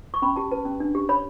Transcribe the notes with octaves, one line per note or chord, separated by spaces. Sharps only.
C#6
C#4 B5
G4 A5
B4 A5
C#4
D4
G4
C#5 B5